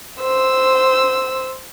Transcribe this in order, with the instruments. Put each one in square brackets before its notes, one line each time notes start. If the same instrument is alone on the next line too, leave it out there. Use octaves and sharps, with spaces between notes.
[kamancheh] C5 E6